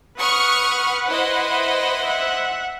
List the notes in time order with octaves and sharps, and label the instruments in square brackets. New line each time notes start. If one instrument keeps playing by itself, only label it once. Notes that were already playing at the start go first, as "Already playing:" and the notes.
[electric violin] B4 F#5 [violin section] C#6 D#6 F6
[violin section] E4 C5 D#5
[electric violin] E5 F#5